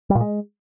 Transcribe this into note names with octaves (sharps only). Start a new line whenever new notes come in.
G3
A#2
G#3